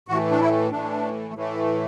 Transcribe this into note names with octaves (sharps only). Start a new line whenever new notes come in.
A2 E3 A3 F#4
D4
E4
A2 E3 A3 D4
A2 E3 A3